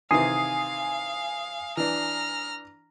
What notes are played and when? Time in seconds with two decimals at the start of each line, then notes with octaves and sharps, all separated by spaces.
0.11 C3 D#3 E3 F5 G#5 D#6 C7
1.77 E3 D4 A#5 F6